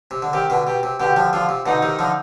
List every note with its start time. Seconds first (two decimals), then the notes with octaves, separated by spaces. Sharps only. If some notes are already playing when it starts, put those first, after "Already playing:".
0.11 C3
0.22 D3
0.33 C3 D#3 G4
0.50 B2 D3
0.67 B2 G4
0.83 C3
1.00 B2 D3 G4
1.16 D3 F3
1.33 D3 F3 F4
1.49 C3
1.66 B2 D3 D#4
1.82 C3 D#3
1.99 D3 F3